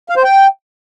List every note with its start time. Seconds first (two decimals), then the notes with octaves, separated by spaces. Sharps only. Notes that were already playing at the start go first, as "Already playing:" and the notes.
0.09 F5
0.16 C5
0.23 G5